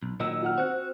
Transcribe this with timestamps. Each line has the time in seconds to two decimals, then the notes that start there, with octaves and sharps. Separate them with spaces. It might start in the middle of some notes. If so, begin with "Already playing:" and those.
0.03 B1
0.20 A#2 D#3 F#3 D#5 E6
0.42 F4 F#5 F6
0.58 C4 F#4 F#5